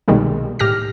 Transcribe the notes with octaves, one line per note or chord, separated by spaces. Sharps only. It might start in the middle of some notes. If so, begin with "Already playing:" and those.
C2 B2 D#3 G3 G#3 A#3
A2 G4 F6 A#6